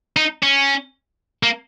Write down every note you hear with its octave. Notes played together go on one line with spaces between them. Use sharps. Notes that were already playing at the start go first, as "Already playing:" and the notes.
D#4
C#4
A#3